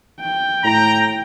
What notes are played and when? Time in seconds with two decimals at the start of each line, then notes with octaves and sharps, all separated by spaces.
0.21 G5
0.64 A2 A#5